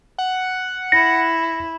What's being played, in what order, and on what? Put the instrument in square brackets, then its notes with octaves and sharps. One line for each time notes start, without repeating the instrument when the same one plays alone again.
[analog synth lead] F#5
[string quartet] E4 [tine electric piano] A#6 C#7